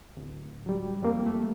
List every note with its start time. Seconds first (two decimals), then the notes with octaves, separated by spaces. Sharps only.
0.17 D1
0.66 F#3 G3
1.02 F2 G3 A#3
1.26 A3